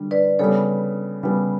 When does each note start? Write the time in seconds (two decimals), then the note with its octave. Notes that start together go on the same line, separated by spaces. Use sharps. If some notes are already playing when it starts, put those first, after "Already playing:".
Already playing: D3 G3
0.11 B4 D5
0.39 C#3 G3 B3 A4 C#5
1.23 C#3 G3 B3